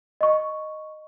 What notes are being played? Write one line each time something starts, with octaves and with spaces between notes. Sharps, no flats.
D#5 C#6